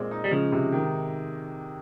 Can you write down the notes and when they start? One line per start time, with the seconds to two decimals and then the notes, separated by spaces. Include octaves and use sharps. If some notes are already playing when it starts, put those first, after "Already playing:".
Already playing: A#2 G#3 C4
0.11 D#4
0.24 G3
0.31 C#3 F3 G#3
0.52 C3
0.72 D#3